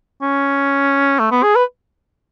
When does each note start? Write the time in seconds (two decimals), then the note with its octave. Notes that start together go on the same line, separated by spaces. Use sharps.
0.22 C#4
1.19 A3
1.31 B3
1.43 G#4
1.56 B4